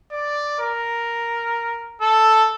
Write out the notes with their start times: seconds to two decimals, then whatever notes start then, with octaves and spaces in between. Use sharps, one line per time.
0.12 D5
0.59 A#4
2.01 A4